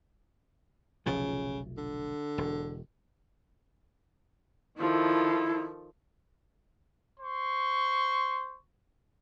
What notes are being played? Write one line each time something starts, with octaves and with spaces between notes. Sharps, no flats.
F1 B1 C#3 F3
D3
E1
D#3 F3 E4 A4
C5 C6 C#6